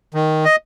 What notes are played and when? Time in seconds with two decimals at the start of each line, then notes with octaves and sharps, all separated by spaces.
0.14 D#3
0.45 D#5